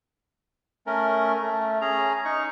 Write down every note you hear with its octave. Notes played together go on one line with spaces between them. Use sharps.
A3 C#4 A#4
A3
C#4 G#4 A#5
D#4 C#6